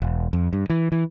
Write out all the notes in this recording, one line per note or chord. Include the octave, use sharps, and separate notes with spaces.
E1
F2
G2
E3
E3